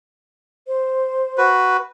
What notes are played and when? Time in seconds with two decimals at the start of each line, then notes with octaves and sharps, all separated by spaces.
0.67 C5
1.38 F#4 B4